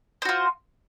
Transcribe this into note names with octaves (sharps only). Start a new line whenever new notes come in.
F4 F#4 C5